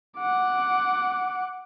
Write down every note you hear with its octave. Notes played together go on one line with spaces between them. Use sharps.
F#5 D6